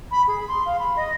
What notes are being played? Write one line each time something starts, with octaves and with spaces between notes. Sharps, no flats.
B5
G#4
C6
F5
B5
D#5